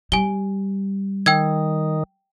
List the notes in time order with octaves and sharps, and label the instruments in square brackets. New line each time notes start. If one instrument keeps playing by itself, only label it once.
[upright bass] G3 [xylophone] G#5 G7
[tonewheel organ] D#3 [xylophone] G5 E6 G#6